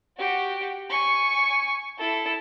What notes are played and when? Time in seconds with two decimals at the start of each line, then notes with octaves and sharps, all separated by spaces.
0.18 F#4 G4
0.90 G#5 C#6
1.99 E4 A4